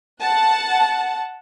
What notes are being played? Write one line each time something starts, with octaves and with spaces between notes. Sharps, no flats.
F#5 A5